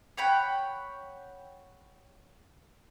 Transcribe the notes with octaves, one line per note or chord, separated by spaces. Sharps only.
C#5 F#5 G5 B5